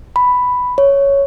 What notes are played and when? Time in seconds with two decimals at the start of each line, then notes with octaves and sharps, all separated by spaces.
0.16 B5
0.78 C#5